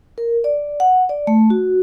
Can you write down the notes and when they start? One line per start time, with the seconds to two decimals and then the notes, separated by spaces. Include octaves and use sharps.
0.18 A#4
0.44 D5
0.80 F#5
1.09 D5
1.27 A3
1.50 F#4